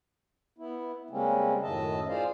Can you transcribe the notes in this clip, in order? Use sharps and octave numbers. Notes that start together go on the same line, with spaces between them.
B3 E4
C#3 G3 G#3 A#3 C4 C#4
F#2 A2 D#3 D#5 E5 A5
F4 G#4 C5 D5 F5